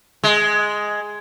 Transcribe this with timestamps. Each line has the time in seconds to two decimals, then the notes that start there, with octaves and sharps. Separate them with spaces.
0.24 G#3